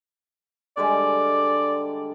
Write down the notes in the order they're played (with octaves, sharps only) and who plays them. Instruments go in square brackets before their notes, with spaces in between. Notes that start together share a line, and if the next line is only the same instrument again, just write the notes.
[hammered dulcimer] D3 G3 G#3 [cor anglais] D5